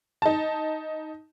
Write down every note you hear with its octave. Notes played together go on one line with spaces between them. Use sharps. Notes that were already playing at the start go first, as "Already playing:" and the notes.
D#4 A5